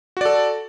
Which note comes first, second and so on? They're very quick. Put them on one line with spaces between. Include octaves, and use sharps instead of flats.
F#4 D5 A4